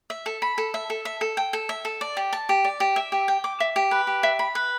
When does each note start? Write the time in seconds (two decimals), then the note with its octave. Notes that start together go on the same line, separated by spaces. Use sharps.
0.10 E5
0.26 A4
0.42 B5
0.58 A4
0.74 E5
0.90 A4
1.05 E5
1.21 A4
1.37 G5
1.53 A4
1.69 E5
1.85 A4
2.01 D5
2.17 G4
2.33 A5
2.49 G4
2.65 D5
2.80 G4
2.96 E5
3.12 G4
3.28 G5
3.44 D6
3.60 E5
3.76 G4
3.91 B4
4.07 G4
4.23 E5
4.39 B5
4.55 B4